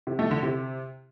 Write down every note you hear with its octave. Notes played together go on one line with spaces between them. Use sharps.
C3
A3
D3
C3